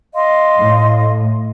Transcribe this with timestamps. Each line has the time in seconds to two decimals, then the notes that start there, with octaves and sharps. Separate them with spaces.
0.14 D#5 F5 C6
0.59 A2